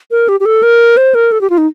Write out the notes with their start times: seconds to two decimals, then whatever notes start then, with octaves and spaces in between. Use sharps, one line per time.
0.11 A#4
0.29 G4
0.40 G4
0.45 A4
0.63 A#4
0.97 C5
1.15 A#4
1.32 A4
1.41 G4
1.50 F4
1.58 D#4